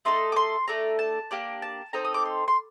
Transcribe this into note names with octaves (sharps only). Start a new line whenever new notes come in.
A3 D#4 A4 C6
D6
C6
A3 D4 A4 A#5
A5
A#3 D4 G4
A5
C4 D#4 A4 A#5
D#6
D6
C6
C6